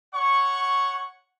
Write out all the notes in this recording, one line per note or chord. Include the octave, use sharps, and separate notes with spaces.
C#5 F#5 C#6